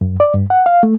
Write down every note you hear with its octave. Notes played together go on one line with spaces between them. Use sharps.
F#2
D5
G2
F#5
F5
A3